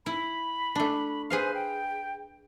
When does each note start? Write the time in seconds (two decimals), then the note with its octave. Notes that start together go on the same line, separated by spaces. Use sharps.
0.06 E4 B5
0.75 A3 D4
1.30 G#4 B4 C5 F5
1.54 G5